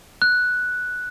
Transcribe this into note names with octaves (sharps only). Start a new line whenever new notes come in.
F#6